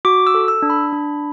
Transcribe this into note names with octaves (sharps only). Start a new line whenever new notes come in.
F#4 D6
E6
A4
E6
D4
B5
D4